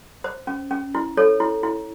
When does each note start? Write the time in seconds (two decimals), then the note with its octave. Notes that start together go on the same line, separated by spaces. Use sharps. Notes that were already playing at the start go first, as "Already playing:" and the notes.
0.24 C5
0.47 C#4
0.71 C#4
0.95 E4
1.17 A4 C#5
1.40 E4
1.63 E4